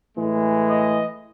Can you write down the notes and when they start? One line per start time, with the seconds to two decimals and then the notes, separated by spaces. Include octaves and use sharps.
0.14 A2 E3 G#3
0.69 D#5